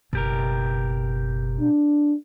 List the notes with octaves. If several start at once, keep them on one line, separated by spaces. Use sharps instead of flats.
F#1 B2 G4 A#4
D4